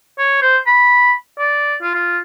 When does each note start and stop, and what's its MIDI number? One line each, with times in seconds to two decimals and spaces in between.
0.19 0.40 73
0.42 0.58 72
0.67 1.13 83
1.39 1.75 74
1.82 1.94 65
1.95 2.18 65